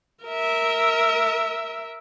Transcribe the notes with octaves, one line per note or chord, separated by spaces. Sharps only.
A#4 E5